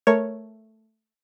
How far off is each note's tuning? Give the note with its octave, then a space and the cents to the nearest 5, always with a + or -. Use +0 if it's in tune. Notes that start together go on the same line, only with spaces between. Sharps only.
A3 +0 A#4 +0 C#5 +0